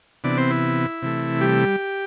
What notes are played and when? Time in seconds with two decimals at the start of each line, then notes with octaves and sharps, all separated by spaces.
0.24 C3 E3 B3 D4 D5
0.38 C4 C5
0.50 E4
1.02 C3 E3 A3
1.41 G3 G4